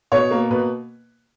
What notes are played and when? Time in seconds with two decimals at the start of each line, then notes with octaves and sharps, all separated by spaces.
0.12 B2 C#5
0.31 A#3
0.50 B2 B4